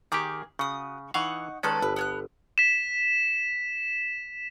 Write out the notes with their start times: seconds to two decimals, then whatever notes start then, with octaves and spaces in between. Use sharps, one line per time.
0.12 D#3 A#3 G4 G#4 D6
0.59 C#3 F#4 D#6
1.14 E3 D#4 F5 F#5 C#6
1.63 D#3 G#3 C#4 A4 B4 D5
1.82 G1 B4
1.96 B3 G#5 F#6
2.58 B6 E7